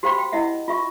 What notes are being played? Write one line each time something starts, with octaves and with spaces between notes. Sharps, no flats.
F#4 G4 C5 F5 G5 B5
F5 G5
E4 D#5 E5 F#5
F4 E5 C#6